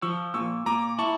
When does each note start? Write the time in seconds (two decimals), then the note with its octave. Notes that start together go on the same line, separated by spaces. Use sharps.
0.02 F3 C#6 E6
0.34 A#2 C#6 E6
0.66 A#2 A#5 D6
0.98 E4 A5 C#6